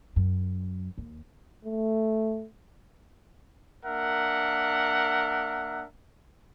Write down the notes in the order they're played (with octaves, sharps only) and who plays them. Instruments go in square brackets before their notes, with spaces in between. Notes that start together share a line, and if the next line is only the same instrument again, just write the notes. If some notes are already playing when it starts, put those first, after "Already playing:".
[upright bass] F#2
D#2
[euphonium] A3
[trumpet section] A#3 D4 A#4 E5 F#5